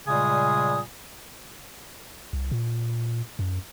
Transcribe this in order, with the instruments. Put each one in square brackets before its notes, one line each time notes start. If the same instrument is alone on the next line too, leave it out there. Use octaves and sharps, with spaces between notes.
[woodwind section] A#2 C#3 G3 G#3 G#5 D#6
[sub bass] C2
A#2
F#2